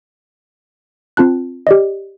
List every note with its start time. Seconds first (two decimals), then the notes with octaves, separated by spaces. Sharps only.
1.17 C4 F4 A5 F#6
1.67 G4 D5 D#5